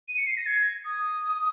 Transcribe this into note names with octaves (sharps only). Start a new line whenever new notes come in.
D#7
C#7
C7
A#6
G#6
D#6